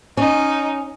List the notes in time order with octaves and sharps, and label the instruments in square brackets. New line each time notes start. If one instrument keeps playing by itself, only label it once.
[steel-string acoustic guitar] C#4 [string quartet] D#4